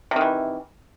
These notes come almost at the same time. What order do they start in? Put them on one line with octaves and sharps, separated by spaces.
C3 D#3 E3